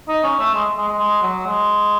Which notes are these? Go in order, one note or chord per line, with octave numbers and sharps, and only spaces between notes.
D#4
C#4
A3
G#3
G#3
G#3
G#3
F#3
G#3